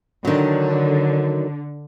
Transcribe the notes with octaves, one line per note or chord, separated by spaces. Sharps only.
D3 D#3 F#3